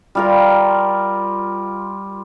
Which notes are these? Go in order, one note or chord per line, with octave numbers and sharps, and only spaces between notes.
G3 F4 A#4